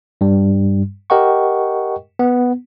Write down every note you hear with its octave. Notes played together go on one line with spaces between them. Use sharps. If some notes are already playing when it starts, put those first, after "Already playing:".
G2 G3
G4 A#4 D#5 F#5 G5 C#6
B3